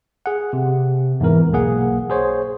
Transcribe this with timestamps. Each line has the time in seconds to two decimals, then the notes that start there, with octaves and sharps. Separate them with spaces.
0.26 G#4 F#5
0.53 C3
1.20 E2 G#2 E3 A#4
1.53 B1 A#3 G#4 F#5
2.10 G#4 C5 C#5